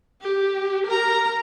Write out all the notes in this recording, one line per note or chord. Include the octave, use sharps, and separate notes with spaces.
G4
A#4 A#5